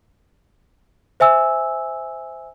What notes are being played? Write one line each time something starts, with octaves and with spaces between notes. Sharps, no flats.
C5 E5 G#5 E6